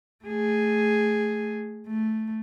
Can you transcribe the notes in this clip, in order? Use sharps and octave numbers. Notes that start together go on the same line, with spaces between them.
A3 G#4
A3